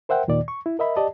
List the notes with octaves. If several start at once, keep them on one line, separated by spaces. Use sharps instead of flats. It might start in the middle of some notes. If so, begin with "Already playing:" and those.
A#4 C5 E5 F#5 G5
D#2 A#2 D#3 D5
C#6
E4
A#4 D#5 E5 B5
G4 D5 D#5 A5